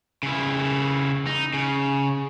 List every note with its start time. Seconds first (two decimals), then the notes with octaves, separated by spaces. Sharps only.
0.23 C#3 E4
1.27 D#4
1.54 C#3